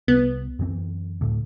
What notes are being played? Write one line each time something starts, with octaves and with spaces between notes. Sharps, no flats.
C2 B3
F#2 E3 C4
D2 A2